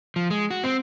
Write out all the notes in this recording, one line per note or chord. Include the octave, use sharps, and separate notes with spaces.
F3
G#3
F#4
C4